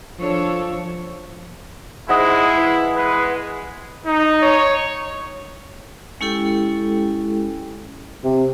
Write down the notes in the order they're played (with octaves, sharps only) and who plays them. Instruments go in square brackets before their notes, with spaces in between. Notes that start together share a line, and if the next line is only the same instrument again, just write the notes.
[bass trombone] F3 [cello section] D4 A4 C#5
[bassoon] G#2 [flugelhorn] G#3 [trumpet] E4 [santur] D#5 F#5
[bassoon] E3
[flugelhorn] G#3 [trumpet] B4
[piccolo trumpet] D#4
[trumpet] C#5
[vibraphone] G#3 C#4 E4 G4 A4 G5
[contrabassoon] C3